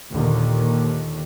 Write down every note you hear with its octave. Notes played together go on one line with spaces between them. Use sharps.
D#2 A#2 D3 D#3